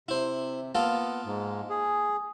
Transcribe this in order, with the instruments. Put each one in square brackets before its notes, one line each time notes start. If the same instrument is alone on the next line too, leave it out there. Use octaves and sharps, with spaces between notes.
[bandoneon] C3 [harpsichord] E4 C5
[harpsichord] A#3 F4 A4 [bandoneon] B3
[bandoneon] G#2
G#4